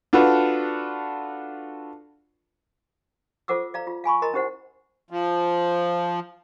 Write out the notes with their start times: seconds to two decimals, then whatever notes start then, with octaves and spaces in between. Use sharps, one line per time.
0.13 D4 F4 F#4 A4 B4
3.48 F4 A4 C5 F#5 D6 E6
3.74 D5 F5 A#5
3.87 F4
4.04 F5 G#5 B5 C#6
4.22 A#4 D#5 A#5 C6
4.34 C#4 E4 G4 C5 F#5
5.10 F3